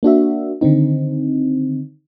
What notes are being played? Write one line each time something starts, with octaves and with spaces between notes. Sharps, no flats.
A#3 D4 F#4 E5
D3 D#3 C4 D#4